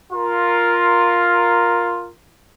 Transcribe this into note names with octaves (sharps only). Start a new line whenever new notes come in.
F4 A#4